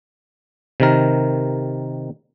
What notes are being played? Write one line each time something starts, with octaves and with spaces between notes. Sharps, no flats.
C3 D#3 A#4